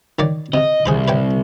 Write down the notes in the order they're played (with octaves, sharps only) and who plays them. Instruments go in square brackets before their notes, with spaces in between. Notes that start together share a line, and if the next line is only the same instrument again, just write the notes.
[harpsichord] D#3 C#5 D5
[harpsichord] C3 [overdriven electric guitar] D#5
[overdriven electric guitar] C2 [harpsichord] G#4 C5 B5
[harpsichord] B4 C#5 G5